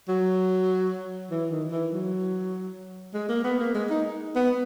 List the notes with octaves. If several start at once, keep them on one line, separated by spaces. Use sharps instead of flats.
F#3
E3
D#3
E3
F#3
G#3
A#3
B3
A#3
G#3
D#4
B3